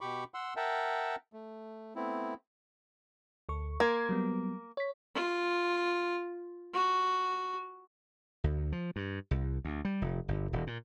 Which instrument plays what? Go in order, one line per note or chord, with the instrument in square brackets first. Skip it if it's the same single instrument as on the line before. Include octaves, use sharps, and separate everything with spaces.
[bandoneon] B2 G4 B5 C#6 D6
F#5 C6 E6
A#4 E5 F#5 G5 A5
A3
A3 B3 C4 E4
[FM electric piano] D2 A4 C#6
[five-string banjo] A#3 [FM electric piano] C6 G#6
[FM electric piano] F#3 G3 B3
C#5 B6
[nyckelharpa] F4
F#4
[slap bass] D2
F3
G2
C2
D2
G3
F1
G1
D#1
A#2